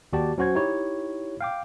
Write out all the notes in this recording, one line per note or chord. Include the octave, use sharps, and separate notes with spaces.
D#2 F#4 G4 D5 A5
F#3 C#4 F#4 C5 G#6
D#4 E4 G4 C#5
F5 G5 D6